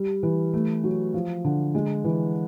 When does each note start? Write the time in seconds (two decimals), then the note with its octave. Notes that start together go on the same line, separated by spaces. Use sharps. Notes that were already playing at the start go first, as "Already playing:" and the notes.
Already playing: G3
0.23 E3
0.54 A3
0.83 F#3
1.14 F3
1.45 D3
1.75 G#3
2.04 E3